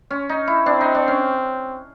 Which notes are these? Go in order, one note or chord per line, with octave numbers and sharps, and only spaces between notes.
C#4
D#4
E4
C4 D4
D#4
D4
C#4